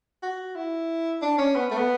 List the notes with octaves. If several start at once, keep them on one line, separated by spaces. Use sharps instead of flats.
F#4
E4
D4
C#4
B3
A3
B3